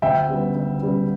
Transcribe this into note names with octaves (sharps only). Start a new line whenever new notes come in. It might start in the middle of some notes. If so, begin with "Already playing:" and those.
D2 E5 G5
C#3 G3 B3
D2
C#3 G3 B3